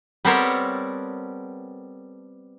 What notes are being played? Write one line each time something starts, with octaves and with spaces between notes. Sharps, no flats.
G3 B3 C4 A4 A#4 C#5